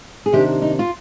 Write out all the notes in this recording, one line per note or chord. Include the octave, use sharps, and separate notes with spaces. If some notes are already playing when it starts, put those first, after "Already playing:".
G#4
C3 D#3 A#3 D4 G4
D#4
F4